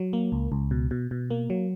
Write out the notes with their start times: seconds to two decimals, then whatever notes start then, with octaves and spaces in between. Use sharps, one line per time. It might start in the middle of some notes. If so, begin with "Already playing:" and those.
Already playing: F#3
0.13 A#3
0.32 C#2
0.52 C#2
0.71 B2
0.91 B2
1.11 B2
1.30 A#3
1.50 F#3